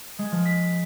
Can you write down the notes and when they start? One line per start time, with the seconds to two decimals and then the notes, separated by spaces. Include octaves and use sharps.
0.19 G#3
0.32 F3
0.45 B6